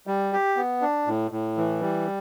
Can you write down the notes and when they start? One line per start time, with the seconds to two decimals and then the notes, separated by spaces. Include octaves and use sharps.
0.07 G3
0.33 G4
0.57 B3
0.81 D4
1.07 A2
1.31 A2
1.57 E3
1.82 G3